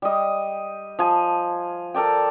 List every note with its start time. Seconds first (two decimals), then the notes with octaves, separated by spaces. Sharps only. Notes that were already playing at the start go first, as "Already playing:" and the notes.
0.02 G3 D#5
0.99 F3 G#5
1.94 A4 A#4 D5 G5